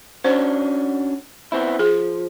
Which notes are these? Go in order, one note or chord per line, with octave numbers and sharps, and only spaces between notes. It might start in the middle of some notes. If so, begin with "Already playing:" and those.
C#4 D4 F#4 C5
B3 C4 E4
F3 G#4